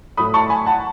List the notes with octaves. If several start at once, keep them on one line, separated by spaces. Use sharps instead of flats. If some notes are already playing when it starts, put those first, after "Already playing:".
A2 F#3 A3 B5 D#6
A5 C#6
G#5 B5
F#5 A5